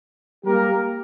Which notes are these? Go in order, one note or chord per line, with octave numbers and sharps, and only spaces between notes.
G3 A#3 G4 A#4